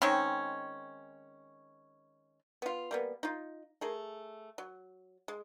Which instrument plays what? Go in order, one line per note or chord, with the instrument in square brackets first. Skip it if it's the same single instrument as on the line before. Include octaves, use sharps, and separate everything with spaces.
[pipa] D#3 G#3 C4 C#4
B3 F4
G3 A#3 B3
D#4 F4
A3 G#4 A#4
F#3
G#3